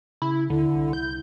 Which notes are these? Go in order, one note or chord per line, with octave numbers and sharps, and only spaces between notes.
C#3 E4
D#2 D3 E4
C2
G6